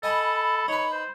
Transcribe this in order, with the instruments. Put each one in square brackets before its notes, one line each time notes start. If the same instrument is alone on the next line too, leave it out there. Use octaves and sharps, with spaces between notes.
[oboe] A4 [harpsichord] D#5 G#5 A5 [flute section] B5
[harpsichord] D#4 B4 [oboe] C#5
[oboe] C5